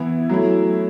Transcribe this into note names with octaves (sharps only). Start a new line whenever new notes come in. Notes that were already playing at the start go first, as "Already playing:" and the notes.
Already playing: E3 B3 E4
F#3 A3 E4